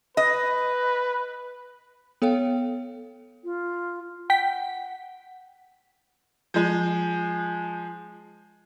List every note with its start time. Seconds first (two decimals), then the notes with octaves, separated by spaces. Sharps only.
0.17 B4 D#5
2.22 B3 A4 C#5 F5 G5
3.44 F4
4.30 F#5 G5 B6
6.54 F3 G#3